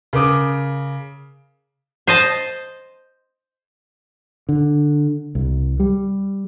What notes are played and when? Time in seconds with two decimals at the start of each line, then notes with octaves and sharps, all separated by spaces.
0.13 C#3 A#4 D6 D#6
2.07 C5 D#5 A5
4.49 D3
5.35 C2
5.80 G3